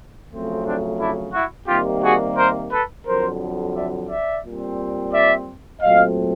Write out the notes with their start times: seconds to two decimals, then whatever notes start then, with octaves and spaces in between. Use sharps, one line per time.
0.30 F2 C#3 F#3 A3 C4
0.64 C4 D4
0.99 D4 E4
1.33 E4 F#4
1.67 C3 D#3 G3 A#3 F4 G4
2.03 F#4 G#4
2.36 A#4 C5
2.71 A4 B4
3.05 F2 D3 F#3 A#4 C5
3.74 D5 E5
4.08 D5 E5
4.43 A#2 G3 C4
5.11 D5 E5
5.80 A#2 F#3 A3 C4 D#5 F5